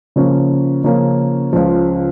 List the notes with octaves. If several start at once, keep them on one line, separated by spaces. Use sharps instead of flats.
C#3 F3 A#3 C#4
C#3 F3 A#3 C#4
C#2 C#3 F3